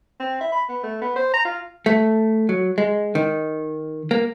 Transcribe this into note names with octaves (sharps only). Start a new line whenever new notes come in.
C4
E5
B5
B3
A3
B3
C5
A#5
F4
A3
F#3
G#3
D#3
A#3